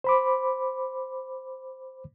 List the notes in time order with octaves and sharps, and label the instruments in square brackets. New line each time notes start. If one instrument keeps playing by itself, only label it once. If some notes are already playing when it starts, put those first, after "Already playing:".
[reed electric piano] C5 B5 D6